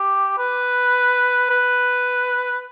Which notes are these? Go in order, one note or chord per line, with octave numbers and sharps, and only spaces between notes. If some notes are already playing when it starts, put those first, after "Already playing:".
Already playing: G4
B4
B4